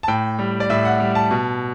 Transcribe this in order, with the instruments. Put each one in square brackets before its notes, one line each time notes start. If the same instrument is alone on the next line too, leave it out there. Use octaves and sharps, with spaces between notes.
[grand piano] A5
A2 G5
G3
D5
A2 E5
F#5
G3
A5
B2